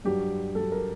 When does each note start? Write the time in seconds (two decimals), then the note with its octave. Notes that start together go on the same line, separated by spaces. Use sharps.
0.05 G2 F#3 G4
0.55 G2 F#3 A4
0.72 A#4